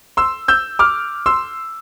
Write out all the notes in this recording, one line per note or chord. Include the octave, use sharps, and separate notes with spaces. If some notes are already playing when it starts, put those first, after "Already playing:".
C6 E6
E6 G6
D6 F6
C6 E6